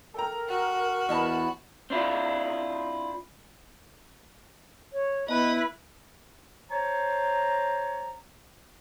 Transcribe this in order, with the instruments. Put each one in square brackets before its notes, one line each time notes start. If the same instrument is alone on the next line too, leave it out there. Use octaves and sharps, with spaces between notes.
[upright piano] A4 G5 A#5 [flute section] A#4
[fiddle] F#4
[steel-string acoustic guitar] E2 E4 A5 [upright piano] D#5 B5
[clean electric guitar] C4 D4 E4 F4
[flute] C#5
[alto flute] B3 [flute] E4 [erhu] B4 [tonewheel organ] D#5
[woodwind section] C5 C#5 A5 A#5